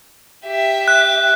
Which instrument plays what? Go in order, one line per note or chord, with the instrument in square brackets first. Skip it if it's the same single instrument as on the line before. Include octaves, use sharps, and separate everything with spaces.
[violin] G4 E5
[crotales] F#6